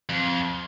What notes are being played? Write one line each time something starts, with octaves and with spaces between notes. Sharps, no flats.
F2